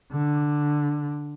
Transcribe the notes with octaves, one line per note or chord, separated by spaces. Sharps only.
D3